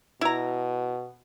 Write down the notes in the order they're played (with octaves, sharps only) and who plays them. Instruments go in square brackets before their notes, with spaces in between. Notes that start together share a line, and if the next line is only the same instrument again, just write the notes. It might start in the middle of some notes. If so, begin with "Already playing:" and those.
[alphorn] B2 [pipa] E4 A#5